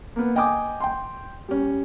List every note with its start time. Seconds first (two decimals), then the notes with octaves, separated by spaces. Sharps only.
0.16 A#3 B3
0.36 D#5 G5 G#5 D6 D#6
0.81 G5 C6
1.48 G3 C#4